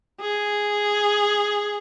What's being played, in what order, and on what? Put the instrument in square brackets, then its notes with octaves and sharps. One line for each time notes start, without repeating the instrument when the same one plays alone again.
[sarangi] G#4